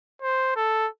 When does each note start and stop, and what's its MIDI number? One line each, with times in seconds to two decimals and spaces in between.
0.22 0.55 72
0.56 0.88 69